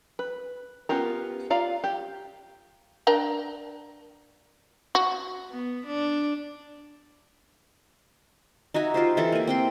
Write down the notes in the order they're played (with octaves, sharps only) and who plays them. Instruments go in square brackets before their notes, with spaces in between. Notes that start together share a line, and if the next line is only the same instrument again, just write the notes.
[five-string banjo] B4
B3 C#4 F4 G4 A#4
F4 D5 F5 A#5
G4
[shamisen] D4 A#4 G5
F#4
[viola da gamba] B3
D4
[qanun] D#4 F#4 E5 G#5
F4 G4 C5
E3 E4 A4
A#3 G#5
C4 G5 C6